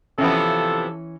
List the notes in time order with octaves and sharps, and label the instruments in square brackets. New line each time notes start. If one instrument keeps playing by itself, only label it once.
[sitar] C3 F3 B3 [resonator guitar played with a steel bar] E3 C#4 [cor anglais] A4